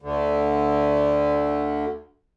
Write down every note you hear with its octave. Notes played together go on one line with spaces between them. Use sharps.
D2 D3